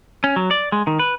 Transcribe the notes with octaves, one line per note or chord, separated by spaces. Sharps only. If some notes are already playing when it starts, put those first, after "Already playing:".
C#4
F#3
D5
G#3
D#3
B4